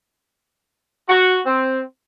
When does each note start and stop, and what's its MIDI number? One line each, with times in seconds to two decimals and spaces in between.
1.09 1.41 66
1.45 1.81 60